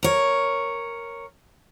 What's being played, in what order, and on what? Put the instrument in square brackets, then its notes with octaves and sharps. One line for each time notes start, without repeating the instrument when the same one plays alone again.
[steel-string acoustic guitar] A#4 C#5